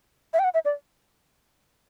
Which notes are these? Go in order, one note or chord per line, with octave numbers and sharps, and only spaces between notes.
E5
G5
F#5
E5
D5